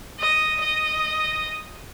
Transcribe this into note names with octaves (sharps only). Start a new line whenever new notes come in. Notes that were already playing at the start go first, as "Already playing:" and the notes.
D#5
D#5